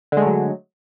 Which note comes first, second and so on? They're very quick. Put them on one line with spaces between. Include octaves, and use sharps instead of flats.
D3 G#3 A3 F#3